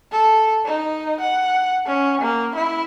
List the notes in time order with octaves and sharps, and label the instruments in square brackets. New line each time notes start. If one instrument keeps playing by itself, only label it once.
[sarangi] A4
D#4
F#5
C#4
A#3
E4